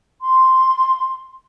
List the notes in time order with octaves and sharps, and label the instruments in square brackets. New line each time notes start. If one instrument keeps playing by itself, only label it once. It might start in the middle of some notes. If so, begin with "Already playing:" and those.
[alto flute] C6